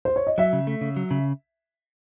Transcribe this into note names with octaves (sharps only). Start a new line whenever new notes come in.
C5
C#5
D#5
F#3 E5
C#3
A3
C#3
F#3
C#3